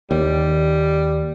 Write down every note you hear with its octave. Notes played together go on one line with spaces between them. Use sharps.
D#2 G3